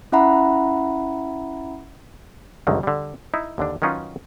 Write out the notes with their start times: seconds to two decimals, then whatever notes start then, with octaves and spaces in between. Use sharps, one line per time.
0.12 C#4 E4 E5 F#5 A#5 B5
2.67 G1 C#2 F#2 D3 D#3
2.83 D3 G3
3.34 D#4 E4
3.58 D#2 D3 D4
3.82 D#3 F#3 C#4 D#4 F4 B4